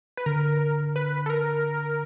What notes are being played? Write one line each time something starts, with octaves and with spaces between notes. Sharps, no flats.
B4
D3 A#4
B4
A4
A#4